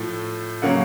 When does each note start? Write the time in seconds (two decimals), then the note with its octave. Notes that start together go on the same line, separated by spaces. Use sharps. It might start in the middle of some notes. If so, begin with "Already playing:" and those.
Already playing: A2 F3 A3
0.62 C#3 F#3 A#3 C#4 F#5